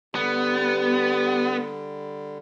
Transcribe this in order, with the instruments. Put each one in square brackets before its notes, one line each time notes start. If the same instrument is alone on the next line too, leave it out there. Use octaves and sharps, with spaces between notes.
[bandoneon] D3 G3 [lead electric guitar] B3 [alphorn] G4